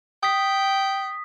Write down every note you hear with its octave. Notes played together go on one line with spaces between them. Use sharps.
G5 D#6 B6